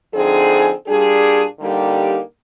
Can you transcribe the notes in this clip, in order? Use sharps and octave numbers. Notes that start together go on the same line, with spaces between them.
D3 F3 C4 D#4 G#4
A#2 G3 D4 G#4
D3 G3 A#3 D#4 G4